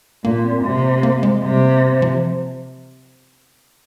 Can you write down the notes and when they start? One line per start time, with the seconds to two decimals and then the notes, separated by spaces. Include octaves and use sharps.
0.24 A#2 A#3
0.44 C4
0.64 C3 G#3
0.74 A#3
0.84 C4
0.93 A#3
1.03 A#3
1.23 G#3
1.43 C3 G3
1.62 A#3
1.82 C4
1.93 A#3
2.02 F3